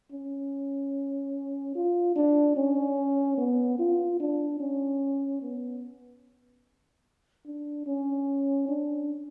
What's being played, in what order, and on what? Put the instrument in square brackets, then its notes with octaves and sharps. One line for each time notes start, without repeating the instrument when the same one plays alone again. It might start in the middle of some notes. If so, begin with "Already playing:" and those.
[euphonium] C#4
F4
D4
C#4
B3
F4
D4
C#4
B3
D4
C#4
D4